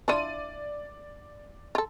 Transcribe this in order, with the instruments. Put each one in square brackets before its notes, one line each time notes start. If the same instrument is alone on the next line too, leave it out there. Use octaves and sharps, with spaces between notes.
[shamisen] D4 E4 F4 [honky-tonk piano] D5 D#7
[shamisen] F4 A4